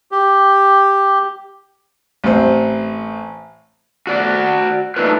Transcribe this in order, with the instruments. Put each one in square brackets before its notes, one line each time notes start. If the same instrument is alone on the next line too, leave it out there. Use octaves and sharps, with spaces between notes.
[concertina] G4
[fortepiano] A1 C4 C5
[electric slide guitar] F#4 D5
A3 D4 D#4 F4 B4